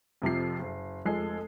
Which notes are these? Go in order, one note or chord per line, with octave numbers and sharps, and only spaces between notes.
F2 C3 F3 C7
F#1
F1 F3 G#3 A4 C7